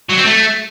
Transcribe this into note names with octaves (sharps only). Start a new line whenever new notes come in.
F#3
C4
A3